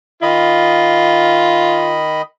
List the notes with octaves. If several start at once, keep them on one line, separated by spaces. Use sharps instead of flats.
D#3 F4 D#5 B5